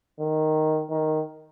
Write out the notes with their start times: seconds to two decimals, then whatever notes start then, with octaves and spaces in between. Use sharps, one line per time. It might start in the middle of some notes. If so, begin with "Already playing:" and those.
0.20 D#3
0.91 D#3